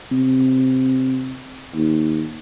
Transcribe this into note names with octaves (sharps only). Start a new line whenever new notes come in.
C3
D#2